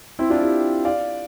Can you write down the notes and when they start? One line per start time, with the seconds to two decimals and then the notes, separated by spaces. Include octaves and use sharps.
0.19 C4 E4
0.30 D4 F4
0.41 E4 G4
0.85 D5 F5